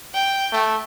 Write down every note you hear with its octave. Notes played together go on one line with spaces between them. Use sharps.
G5
A3